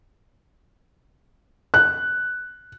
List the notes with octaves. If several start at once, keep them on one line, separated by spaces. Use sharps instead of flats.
F#6